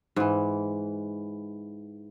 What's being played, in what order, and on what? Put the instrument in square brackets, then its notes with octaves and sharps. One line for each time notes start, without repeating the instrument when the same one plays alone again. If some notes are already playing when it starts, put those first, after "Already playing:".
[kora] G#2 E3